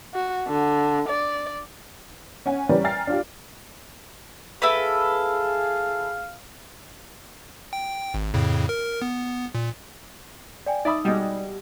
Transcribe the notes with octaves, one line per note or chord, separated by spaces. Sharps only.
F#4
D3
D5
C#4 F#5 G#5
E3 G3 C#4 A#4 B4 D5
G5 G#5 A#5 F6 A6 C7
D4 F4 G4
E4 G#4 A4 B4 F5
G5
G#1
F2 A2 C#3
A#4
B3
A#2
D5 G5 G#5
D#4 D5 E5 B5 D#6 E6
B2 G3 G#3